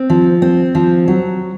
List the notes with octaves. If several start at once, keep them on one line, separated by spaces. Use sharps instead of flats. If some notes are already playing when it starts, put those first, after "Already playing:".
Already playing: C4
F3
C4
F3
F#3